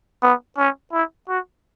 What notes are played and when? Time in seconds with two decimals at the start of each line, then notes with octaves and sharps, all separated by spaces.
0.22 B3
0.58 C#4
0.92 E4
1.28 F#4